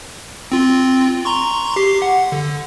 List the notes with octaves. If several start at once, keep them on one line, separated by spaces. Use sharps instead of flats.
C4 F4
A#5 C6 C#6
G4 C7
F#5
D3